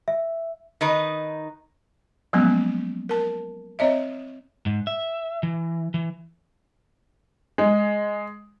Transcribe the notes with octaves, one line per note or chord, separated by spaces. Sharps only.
E5
D#3 D#4 B4
F3 F#3 G#3 A#3 B3 C#4
A#4 A5
C4 C#5 D#5 E5
G#2
E5
E3
E3
G#3